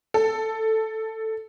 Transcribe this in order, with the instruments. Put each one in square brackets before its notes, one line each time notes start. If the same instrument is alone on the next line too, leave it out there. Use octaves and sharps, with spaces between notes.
[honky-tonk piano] A4